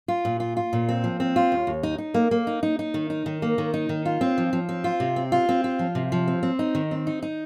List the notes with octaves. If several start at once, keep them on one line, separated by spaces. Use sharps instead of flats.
F4
A#2
F4
F4
A#2
C4
F3
C4
F4
D#2
D#2
D#4
D#4
A#3
A#3
D#4
D#4
D#4
D#3
D#4
D#3
A#3
D#3
D#4
D#3
F4
C4
F3
F3
C4
F4
C3
C4
F4
C4
F4
F3
C3
F3
C4
C4
D#4
D#3
C4
D#4
D#4